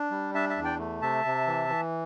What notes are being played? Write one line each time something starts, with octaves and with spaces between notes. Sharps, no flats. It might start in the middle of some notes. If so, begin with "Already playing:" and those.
Already playing: D4
G3
D4 E5 A5
E5 A5
E2
D5 G5
A3
C3 E5 A5
C3
E3
E3